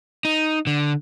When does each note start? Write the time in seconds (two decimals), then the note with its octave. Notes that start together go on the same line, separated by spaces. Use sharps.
0.25 D#4
0.67 D3